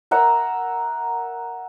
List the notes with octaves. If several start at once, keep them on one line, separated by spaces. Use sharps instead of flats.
A#4 E5 F#5 A#5